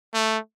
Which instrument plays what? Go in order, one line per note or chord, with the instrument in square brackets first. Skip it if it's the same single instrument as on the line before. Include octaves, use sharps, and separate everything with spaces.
[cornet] A3